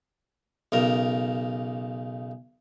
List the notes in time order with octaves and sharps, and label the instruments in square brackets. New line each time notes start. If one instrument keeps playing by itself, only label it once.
[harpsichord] B1 C#3 A#4